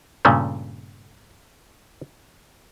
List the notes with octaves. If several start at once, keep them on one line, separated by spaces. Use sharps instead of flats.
G2 A#2 C#3 A3 C#4